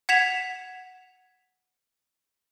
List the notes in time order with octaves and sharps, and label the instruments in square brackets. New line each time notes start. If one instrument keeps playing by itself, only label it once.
[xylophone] F#5 G#6 B6 E7 F7